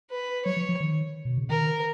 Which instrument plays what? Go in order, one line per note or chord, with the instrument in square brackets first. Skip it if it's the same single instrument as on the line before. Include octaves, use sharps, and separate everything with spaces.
[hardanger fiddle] B4
[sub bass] F#3 [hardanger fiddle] C#5
[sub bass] F3
F3
D#3
B2
C#3
[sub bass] D#3 [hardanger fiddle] A#4